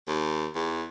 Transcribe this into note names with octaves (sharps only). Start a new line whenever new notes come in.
D#2
E2